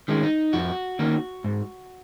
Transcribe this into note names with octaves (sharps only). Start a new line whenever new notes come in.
D#3 G#3 C#4
D#4
F2 F#4
D#3 A#3 C#4
G#2